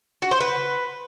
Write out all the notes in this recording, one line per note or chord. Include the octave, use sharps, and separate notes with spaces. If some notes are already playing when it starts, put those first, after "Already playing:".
F#4
C5
B4